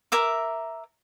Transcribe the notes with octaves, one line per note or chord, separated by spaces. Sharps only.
A#4 E5 D6